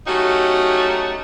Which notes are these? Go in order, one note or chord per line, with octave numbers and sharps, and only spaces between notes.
F#3 A3 C#4 D#4 F#4 G4